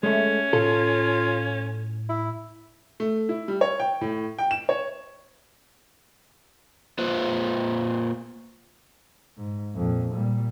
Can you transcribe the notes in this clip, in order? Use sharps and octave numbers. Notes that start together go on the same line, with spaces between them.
G#3 A3 C#4
A2 F4 A4
E4
A3
E4
G3
C#5
G5
A2
G5
E7
C#5
A#3 F4 B4 C5
G#2
F2 A#2
A#2 G3